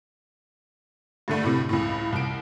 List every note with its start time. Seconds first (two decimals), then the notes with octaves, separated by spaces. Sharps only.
1.28 G2 D3 A3
1.43 A2 C3
1.69 C#2 A2
2.12 C2 D7